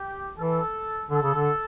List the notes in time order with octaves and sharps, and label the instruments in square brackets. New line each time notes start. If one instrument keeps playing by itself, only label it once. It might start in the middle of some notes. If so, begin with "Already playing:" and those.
Already playing: [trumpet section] G4
[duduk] E3 [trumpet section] A4
[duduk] D3 [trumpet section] A4
[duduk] C#3
D3